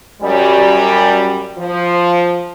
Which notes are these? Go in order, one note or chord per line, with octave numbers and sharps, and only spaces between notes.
F#2 G3
F3